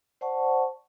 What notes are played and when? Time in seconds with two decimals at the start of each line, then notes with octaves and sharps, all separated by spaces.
0.21 C5 D5 F#5 A5 C#6